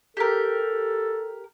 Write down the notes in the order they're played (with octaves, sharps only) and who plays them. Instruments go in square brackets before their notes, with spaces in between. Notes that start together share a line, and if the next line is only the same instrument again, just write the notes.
[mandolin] G4 A#4 [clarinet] A4